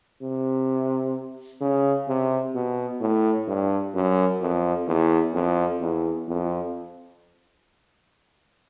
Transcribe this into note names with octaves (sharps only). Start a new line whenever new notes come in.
C3
C#3
C3
B2
A2
G2
F#2
F2
E2
F2
E2
F2